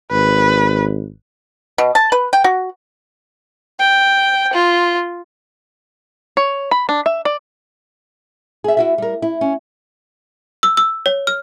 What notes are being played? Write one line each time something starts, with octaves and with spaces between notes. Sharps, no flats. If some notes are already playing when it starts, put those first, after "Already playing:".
G#1 B4
B2
A5
B4
G5
F#4
G5
F4
C#5
B5
D4
E5
D5
G#4 E5
E4 F#4 E5
G3 A#4
E4
C#4
E6
E6
C#5
F6